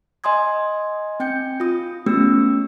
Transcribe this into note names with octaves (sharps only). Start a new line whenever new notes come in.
D#5 G#5 C6 D#6 G#6
C4 G5 G6 C#7
F4 D#6
A3 B3 C#4 G4 E6